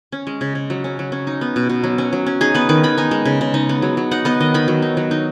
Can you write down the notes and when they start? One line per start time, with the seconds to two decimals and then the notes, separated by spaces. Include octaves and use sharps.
0.12 C#4
0.27 G#3
0.41 C#3
0.55 C#3
0.70 F#3
0.84 C#4
0.99 F#3
1.12 C#4
1.27 D#4
1.41 B3
1.56 B2
1.69 B2
1.84 F#3
1.98 C#4
2.13 F#3
2.26 C#4
2.41 D#4 G#4
2.54 B3 B4
2.69 D#3 B4
2.83 D#3 B5
2.98 D#4 G#5
3.11 G#3
3.25 C#3
3.41 C#3
3.54 D#4
3.69 B3
3.82 F#3
3.97 F#3
4.11 D#4 F#5
4.25 B3 D#5
4.40 D#3 D#5
4.54 D#3 B5
4.68 F#3
4.82 D#4
4.97 F#3
5.11 D#4